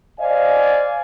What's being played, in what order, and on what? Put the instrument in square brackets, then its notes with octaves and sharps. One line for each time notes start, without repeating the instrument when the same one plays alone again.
[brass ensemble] C5 D5 D#5 F5 G#5